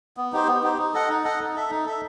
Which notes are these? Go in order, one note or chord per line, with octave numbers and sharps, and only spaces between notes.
B3
D#4 G4 C5
B3
D#4 G4 C5
D#4
A4 D#5 F#5
D#4
A4 D#5 F#5
D#4
A4 E5
D#4
A4 E5